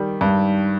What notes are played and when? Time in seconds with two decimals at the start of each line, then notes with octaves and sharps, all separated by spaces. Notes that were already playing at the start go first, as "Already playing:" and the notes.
Already playing: D#3 G3
0.21 G2